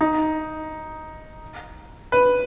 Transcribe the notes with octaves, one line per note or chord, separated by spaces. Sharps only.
D#4
B4